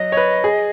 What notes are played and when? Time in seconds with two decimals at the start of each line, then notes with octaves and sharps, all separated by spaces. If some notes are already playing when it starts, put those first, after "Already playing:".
Already playing: F#3 D#5
0.12 C#5
0.17 B4
0.44 G#4